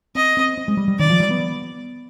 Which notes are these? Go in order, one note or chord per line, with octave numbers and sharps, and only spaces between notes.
C4 D#5
C4
C4
G#3
G3
G3
D#3 D5
F3
G3
B3